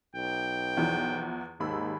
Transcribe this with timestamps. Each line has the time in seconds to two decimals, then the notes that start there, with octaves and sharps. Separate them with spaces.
0.15 B1 G5
0.77 E2 E3 F3
1.60 D#2 G#2 B5 E6